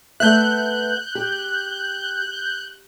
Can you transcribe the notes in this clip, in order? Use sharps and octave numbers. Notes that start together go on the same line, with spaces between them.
A3 B3 E5 F#6 G6
G4